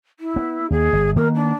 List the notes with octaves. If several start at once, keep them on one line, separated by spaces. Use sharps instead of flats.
E4
B3
D#2 G#4
G1
D#3 A#3 B3 A#4
D4